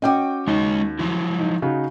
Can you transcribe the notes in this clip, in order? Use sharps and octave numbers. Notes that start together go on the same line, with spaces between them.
C#4 F#4 D#5 G5 D6
D#2 G#3 C#5 D#5
F3 F#3 E4
D#4
C#3 D#4 F#4